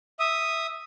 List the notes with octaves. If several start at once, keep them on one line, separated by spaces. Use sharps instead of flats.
E5 D#6